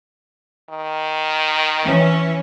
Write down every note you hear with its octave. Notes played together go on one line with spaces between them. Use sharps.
D#3
E3 C#4